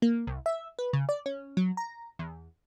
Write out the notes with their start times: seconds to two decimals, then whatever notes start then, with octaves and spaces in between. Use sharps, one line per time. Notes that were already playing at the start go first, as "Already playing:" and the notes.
0.02 A#3
0.27 C2
0.46 E5
0.79 B4
0.93 C#3
1.09 D5
1.26 C#4
1.57 F#3
1.77 A#5
2.19 E2